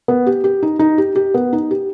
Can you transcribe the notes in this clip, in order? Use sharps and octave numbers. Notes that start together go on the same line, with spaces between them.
B3
G4
G4
D#4
D#4
G4
G4
B3
D#4
G4